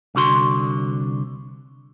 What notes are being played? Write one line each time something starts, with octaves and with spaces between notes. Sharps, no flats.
C2 D3 F#4 C6